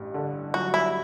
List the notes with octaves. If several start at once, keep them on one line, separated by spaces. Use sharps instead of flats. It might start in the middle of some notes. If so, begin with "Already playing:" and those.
Already playing: A1 G2
D3
F#3 F#4
E4